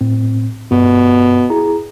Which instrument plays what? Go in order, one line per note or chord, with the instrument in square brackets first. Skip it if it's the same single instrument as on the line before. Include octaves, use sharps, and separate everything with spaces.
[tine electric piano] A2 C4
[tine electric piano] G2 [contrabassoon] B2
[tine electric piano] E4 G#4 A#5